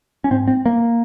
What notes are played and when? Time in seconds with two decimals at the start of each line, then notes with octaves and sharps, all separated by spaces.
0.24 C#4
0.31 G#2 C4
0.48 C4
0.66 A#3